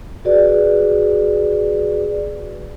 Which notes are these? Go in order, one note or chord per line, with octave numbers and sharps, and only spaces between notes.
F#4 G#4 B4 D5